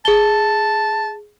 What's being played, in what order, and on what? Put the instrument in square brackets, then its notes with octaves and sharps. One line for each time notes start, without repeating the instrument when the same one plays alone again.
[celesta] G#4 G7 [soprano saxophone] A5